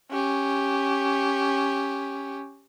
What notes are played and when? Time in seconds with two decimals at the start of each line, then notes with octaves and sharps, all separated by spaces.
0.11 C#4 G4